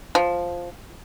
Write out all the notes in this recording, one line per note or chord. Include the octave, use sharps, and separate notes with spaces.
F3